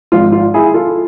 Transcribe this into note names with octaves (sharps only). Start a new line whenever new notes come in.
G#1 G#2 F3 F4
F4
E4 G#4
F4 A4